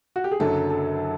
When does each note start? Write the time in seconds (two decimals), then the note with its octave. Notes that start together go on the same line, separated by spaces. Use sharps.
0.16 F#4
0.24 G4
0.32 G#4
0.40 F#1 F#2 D3 F#3 A4
0.70 A4